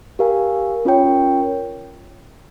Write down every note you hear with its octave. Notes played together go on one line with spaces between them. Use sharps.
G4 A#4 F5 G#5
C#4 F4 A#4 C#5 G5